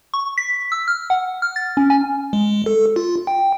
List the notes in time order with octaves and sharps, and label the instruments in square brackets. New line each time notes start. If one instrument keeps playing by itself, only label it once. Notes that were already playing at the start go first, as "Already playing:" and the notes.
[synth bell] C#6
B6
E6
F6
F#5
F6
A6
C#4
G#5
[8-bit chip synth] G#3
A4
F4
G5